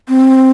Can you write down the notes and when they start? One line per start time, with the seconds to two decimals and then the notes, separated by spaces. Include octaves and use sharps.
0.09 C4